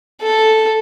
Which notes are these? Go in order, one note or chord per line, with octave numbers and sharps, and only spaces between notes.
A4